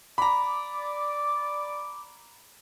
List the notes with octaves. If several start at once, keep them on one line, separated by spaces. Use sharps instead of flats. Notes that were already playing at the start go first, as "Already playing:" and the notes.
D5 A#5 B5 D6